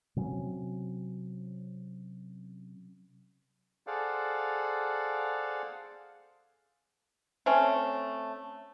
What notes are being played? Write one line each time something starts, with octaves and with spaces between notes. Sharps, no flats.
C3 F#3 C#4
G#4 A4 C5 D5 F5 F#5
A3 C4 C#4